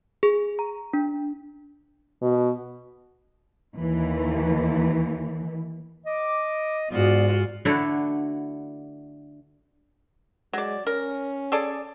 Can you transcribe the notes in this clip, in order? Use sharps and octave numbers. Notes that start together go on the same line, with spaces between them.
G#4
A#5
D4
B2
D#2 E3
D#5 D6
G#2 B3 F4 F#4 D5
D3 A3 D4 E4 F#4
F#3 G#3 D5
C#4 A#4
G#4 A4 D5